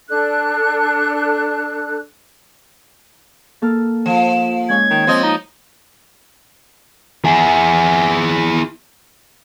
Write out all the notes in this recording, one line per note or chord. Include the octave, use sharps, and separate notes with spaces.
D4 A4 F#6
A#3 A4 F6
F3 E7
G#3 C#4 C#5 G#6
D#3
F3 C4 D#5
D#4
E4 G#4